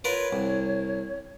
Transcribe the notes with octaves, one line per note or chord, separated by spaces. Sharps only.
F4 A#4 B4 C#5
C2